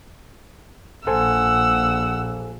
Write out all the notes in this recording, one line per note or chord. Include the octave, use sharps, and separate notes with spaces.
A#1 A4 C5 F#5 G#5 E6